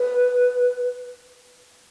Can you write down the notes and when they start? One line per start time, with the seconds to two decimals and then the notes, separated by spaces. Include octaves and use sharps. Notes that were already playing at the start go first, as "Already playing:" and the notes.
Already playing: B4